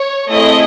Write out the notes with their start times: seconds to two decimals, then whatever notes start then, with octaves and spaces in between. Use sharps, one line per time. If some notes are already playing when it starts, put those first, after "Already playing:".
Already playing: C#5
0.29 A3 C4 E4 G#4 D#5